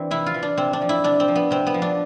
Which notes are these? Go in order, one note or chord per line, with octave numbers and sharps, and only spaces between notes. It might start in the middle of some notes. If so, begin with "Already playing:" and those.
Already playing: E3 C4 D4
C3 E4
F4
E3
D4
C3 C4
D4
F3
E4
C3 D4
C4
F3
B3
C3 C4
B3
F3
D4